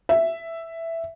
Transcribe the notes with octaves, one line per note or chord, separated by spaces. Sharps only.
E5